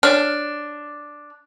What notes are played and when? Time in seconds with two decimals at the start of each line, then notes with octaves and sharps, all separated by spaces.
0.03 D4 C#5 F6